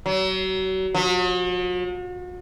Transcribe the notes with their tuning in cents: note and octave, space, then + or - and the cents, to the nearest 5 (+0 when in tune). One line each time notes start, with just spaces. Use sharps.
F#3 +35
F#3 -45